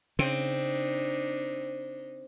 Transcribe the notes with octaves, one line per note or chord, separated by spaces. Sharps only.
C#3 C4 D4 D#4